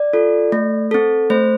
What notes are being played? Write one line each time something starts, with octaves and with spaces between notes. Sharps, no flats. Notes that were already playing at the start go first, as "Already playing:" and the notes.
Already playing: D5
F4 A4
A3
C4 A4
A3 C5